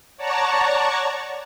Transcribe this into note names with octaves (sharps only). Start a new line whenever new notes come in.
C#5 D5 F#5 A5 A#5 C#6